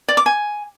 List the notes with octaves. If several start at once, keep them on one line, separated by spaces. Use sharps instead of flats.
D5
D6
G#5